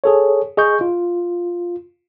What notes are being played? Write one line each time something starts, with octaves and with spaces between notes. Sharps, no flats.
G#4 A4 C#5
G#4 D#5 C#6 G6
F4